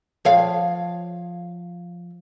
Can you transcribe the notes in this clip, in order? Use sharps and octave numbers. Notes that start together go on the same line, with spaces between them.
F3 C#5 F5